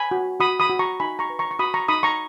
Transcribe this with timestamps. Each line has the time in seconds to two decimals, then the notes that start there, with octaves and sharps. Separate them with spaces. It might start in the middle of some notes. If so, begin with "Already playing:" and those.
Already playing: G#5 B5
0.11 F#4
0.40 F#4 B5 D#6
0.60 B5 D#6
0.70 F#4
0.79 A#5 C#6
1.00 D#4 G#5 B5
1.19 A#5 C#6
1.30 B4
1.39 A#5 C#6
1.51 C#6
1.59 F#4 B5 D#6
1.74 A#5 C#6
1.88 D#4 B5 D#6
2.03 A#5 C#6